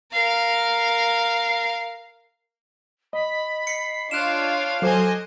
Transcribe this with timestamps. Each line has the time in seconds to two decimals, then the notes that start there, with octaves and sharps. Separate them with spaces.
0.12 A#4 F5
3.13 D#5 B5
3.67 C7 C#7
4.11 D4 F4 C#5 F5 F#6 D7 E7
4.82 F#3 A4 C5 D#5 G#5 D6